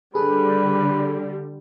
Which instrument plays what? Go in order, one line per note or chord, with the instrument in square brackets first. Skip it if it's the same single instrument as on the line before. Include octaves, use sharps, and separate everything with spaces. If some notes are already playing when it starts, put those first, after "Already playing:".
[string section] D3 G3 [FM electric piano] G#4 A4 [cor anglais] B4